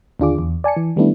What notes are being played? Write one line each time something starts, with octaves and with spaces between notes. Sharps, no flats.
D#2 D3 D4 F4 G#4 D6
E2
D5 G#5 A5 C#7
E3
D#3 G3 A3 B3 D4 E4